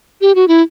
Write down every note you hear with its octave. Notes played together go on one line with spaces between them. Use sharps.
G4
F#4
E4